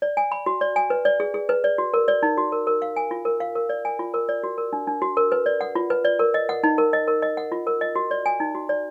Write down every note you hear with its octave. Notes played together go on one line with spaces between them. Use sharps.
D5
G#5
B5
F#4
D5
G#5
B4
D5
G#4
G#4
B4
D5
F#4
A#4
D5
D#4
F#4
A#4
A#4
F5
G#5
F4
A#4
F5
A#4
D5
G#5
F4
A#4
D5
F#4
A#4
D4
D4
F#4
A#4
B4
D5
F#5
F4
B4
D5
A#4
D#5
F#5
D#4
A#4
D#5
A#4
D#5
F#5
F4
A#4
D#5
F#4
D5
G#5
D#4
F#4
D5